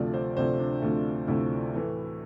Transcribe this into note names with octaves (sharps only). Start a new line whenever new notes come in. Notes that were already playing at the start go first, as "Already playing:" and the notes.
Already playing: D2 C3 F3 A3 D5
C5
D2 C3 F3 A3 C5
D4
D2 C3 F3 A3
D2 C3 F3 A3 E4
A2 E3 A3